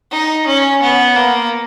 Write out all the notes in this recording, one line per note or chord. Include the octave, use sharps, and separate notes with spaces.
D#4
C#4
B3
A#3